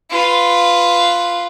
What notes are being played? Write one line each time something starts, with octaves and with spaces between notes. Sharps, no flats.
F4 B4